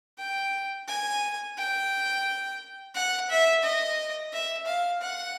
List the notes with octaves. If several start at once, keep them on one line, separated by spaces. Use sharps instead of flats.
G5
G#5
G5
F#5
E5
D#5
E5
F5
F#5